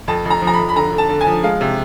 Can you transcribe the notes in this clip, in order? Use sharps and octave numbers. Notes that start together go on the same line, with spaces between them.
F2 A5
F2
A#5
F3
A#5
B5
F2
B5
D3 A#5
D3
A5
D3
G#5
F3
G#3 F5
C3